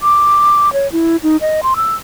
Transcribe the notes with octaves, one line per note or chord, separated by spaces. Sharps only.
D6
C#5
E4
D#4
D#5
C6
E6